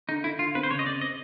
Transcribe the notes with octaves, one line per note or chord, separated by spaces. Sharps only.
D3 D#4
D3 E4
D3 F4
C4 B4
C5
C#3 C#5
D#5
C4 D5
C4 D#5